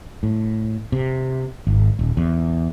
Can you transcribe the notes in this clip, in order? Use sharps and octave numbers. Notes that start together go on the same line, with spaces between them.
A2
C3
G#1
D#1
E2